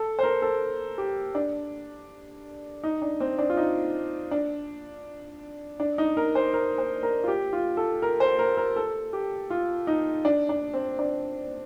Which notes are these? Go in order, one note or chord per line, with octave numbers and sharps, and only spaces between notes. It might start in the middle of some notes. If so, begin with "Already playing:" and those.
Already playing: A4
C5
A#4
A4
G4
D4
D#4
D4
C4
D4
F4
D#4
D4
D4
D#4
A#4
C5
A#4
C5
A#4
F4
G4
F4
A4
A#4
C5
A#4
A#4
A4
G4
F4
D#4
D4
D4
C4
D4